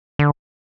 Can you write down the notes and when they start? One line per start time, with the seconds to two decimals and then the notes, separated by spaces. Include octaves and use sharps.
0.19 D3